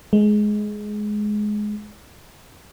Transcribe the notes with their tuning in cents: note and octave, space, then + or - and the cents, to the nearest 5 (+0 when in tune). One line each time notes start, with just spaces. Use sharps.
G#3 +15